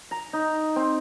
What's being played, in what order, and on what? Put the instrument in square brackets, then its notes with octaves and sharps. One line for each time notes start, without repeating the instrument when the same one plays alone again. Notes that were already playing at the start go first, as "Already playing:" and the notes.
[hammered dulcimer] A#5
D#4
C4